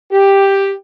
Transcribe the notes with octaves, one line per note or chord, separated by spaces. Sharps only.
G4